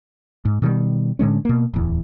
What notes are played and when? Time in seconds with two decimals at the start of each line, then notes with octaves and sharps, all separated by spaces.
0.45 G#2
0.62 B2 D#3 F3 G3
1.19 A2 D3 G#3 C#4
1.45 B2 A#3
1.74 D1 E2